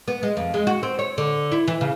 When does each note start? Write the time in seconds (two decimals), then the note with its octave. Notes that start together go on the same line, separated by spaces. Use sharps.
0.08 B3
0.23 G#3
0.37 F2
0.54 G#3
0.67 F#4
0.83 C4
0.99 C#5
1.18 D3
1.52 E4
1.67 E3
1.81 C#3